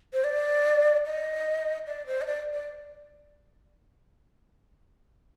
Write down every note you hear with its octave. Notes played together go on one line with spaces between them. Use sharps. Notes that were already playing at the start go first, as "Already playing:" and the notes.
C5
D5
D#5
D5
C5
D#5
D5
D5